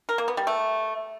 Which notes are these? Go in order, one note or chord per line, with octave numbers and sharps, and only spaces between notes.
A#4
A#3
B3
G3
A3